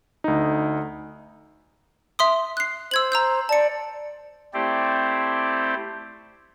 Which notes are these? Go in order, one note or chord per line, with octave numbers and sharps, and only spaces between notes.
D2 D#4
E5 C6 D#6
F#6 C7
C5 E6 G#6 F#7
A#5 E6 G6
D5 A5 C#7
A3 C4 E4 G4 C5 D5